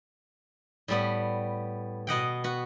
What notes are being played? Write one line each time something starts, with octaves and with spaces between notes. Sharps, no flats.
A2 G3 B3
B2 D#5 F#5 G5
B3 F#4